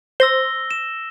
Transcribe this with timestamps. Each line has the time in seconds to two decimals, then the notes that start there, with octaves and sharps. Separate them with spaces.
0.20 C5 E6 A#6 G7
0.71 E7